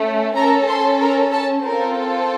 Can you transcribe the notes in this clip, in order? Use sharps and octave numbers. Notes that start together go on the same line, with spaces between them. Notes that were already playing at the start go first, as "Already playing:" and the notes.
Already playing: A3 C#4 A4
C#4 A4 A#4 A#5
C5 C6
A#4 A#5
A4 A5
C4 F4 A4 A#4